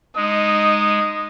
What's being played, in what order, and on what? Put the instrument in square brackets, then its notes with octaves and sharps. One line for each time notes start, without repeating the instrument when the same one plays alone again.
[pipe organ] G#3 [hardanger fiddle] D#4 [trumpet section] D#6